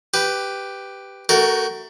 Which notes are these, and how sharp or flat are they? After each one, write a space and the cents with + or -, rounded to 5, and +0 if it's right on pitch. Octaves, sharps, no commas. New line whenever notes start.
G4 +0 B4 +10
A3 +20 F#4 +25 A#4 +0